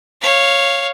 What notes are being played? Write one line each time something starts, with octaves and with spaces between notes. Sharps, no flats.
C#5 F5